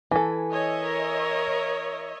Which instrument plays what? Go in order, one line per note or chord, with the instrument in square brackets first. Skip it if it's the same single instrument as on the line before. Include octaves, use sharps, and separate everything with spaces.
[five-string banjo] E3 A4 [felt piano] G#5
[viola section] C#5 D#5 E5
[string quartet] A#4